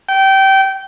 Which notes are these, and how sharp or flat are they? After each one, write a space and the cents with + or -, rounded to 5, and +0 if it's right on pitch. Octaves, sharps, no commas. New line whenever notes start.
G5 -20